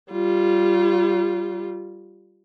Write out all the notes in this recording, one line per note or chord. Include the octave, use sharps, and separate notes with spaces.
G3 F4